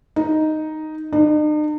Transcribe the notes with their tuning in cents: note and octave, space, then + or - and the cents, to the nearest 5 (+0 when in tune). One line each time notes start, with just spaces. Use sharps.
D#4 +0
D#4 -45